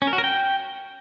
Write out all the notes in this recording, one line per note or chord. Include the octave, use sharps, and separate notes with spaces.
C#4
A#4
F#4
A#4
G5